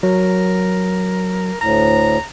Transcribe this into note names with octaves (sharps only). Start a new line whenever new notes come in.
F#3 A#4
D2 A2 A#5